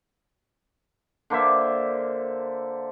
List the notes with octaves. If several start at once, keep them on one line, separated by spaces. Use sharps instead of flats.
D3 A#3 C5 E5